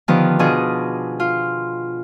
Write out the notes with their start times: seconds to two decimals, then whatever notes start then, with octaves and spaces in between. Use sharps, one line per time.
0.08 D3 D#3 F3 B3 G4 B4
0.39 B2 B3 D4 F4 G#4 D#5
1.20 F4